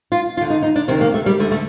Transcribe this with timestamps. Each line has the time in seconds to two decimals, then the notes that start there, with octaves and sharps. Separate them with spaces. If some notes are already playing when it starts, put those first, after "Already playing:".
0.12 F4
0.37 D2 F4
0.41 D3
0.50 D#4
0.62 D#4
0.76 D4
0.88 D2 C3 D#3 C4
1.01 A#3
1.14 A3
1.26 G3
1.39 D2 D3 A3
1.52 A3